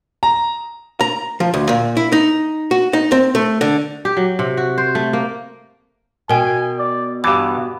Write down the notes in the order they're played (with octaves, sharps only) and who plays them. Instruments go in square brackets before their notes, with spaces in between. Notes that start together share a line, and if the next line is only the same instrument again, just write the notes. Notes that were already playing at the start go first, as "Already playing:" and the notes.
[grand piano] A#5
[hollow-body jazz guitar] A#5
F3
D2
A#2
E4
D#4
F#4
D#4
C4
A3
D3
[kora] G4
F#3
C3
F#4
C5
A3
A#3
[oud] B2 [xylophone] A#4 G5 [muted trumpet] G#5
[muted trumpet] D5
[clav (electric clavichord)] G2 E3 [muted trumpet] B3 [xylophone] G4 D6